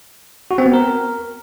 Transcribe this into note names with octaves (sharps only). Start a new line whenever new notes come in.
F#4
C4
B3
A#4